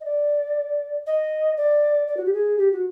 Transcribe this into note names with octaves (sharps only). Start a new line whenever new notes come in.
D#5
D5
D#5
D5
D5
F#4
G4
G#4
G4
F#4